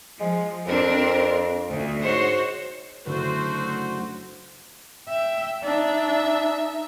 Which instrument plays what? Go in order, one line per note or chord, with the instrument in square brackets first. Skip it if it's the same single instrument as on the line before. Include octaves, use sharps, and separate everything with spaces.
[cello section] F3 [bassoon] G#3
[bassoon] F2 [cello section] C4 D4 A#4
[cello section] D2
[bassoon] G#2 [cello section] F#4 C5 C#5
[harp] F#1 D3 [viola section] A3 F#4 C5
[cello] E5 [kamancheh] G5
[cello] D4 [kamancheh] D#4 E5